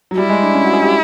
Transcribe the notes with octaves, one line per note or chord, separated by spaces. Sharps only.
F#3
G3 E4
G#3
D4
C#4
F#4
G#4
G4